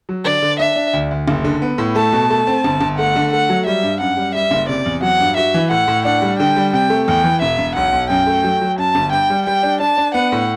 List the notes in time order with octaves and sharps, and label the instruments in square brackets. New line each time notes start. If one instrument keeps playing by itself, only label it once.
[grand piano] F#3
[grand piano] D3 [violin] D5
[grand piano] D3
[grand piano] D4 [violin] E5
[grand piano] D4
D2
D2
F#1
D3
B3
A2
[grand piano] A3 [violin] A5
[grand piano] B2
A3
C4
G1
G1
[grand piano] A3 [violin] F#5
[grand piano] D3
[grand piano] A3 [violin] F#5
[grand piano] F#3
[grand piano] G3 [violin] E5
[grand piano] G2
[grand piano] F#2 [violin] F#5
[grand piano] G3
[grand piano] G3 [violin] E5
[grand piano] F#1
[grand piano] C3 [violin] D5
[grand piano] E2
[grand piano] F#3 [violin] F#5
[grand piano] G2
[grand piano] F#4 [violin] E5
[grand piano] E3
[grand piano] A2 [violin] F#5
[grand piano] A2
[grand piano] D4 [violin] F#5
[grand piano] G3
[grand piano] D3 [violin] G5
[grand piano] G3
[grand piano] C3 [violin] G5
[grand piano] A3
[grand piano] E2 [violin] G5
[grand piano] E3
[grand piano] E1 [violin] E5
[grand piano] E1
[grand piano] B1 [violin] F#5
[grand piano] B1
[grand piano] F#2 [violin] G5
[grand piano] A3
F#3
F#3
[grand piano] F#2 [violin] A5
[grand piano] G1
[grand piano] G2 [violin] G5
[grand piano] G3
[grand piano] G3 [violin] G5
[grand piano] D4
[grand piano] D4 [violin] A5
[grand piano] D4
[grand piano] B3 [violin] F#5
[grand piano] A2